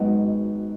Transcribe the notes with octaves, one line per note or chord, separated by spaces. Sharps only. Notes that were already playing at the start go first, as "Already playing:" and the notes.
Already playing: G#1 G#2 F#3 B3 D#4 F#5
D#5